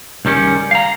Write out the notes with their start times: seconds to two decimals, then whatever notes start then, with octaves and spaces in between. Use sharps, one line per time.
0.25 C#2 D#3 G3 C#4
0.71 F5 A#5